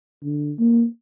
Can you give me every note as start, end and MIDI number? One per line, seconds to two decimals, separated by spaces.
0.23 0.52 50
0.59 0.85 58